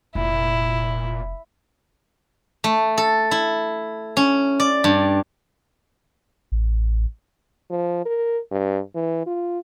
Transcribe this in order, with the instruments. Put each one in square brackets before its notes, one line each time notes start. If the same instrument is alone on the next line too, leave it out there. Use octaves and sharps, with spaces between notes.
[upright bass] F1 [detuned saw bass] A#2 [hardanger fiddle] E4
[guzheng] A3
A4
E4
C#4
D5
G2
[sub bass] A1
[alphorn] F3
A#4
G2
E3
F4